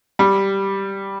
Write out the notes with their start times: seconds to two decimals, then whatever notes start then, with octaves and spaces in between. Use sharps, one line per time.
0.19 G3